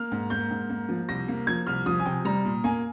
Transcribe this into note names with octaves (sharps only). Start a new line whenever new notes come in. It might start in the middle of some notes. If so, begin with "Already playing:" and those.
Already playing: A#3 F6
G#2
A#3 G6
G#2
A#3
F3
C2 A#6
A#3
F3 G#6
C2 F6
F3 D#6
G#5
C3 G5
G3 A#5
A#2
A#3 G#5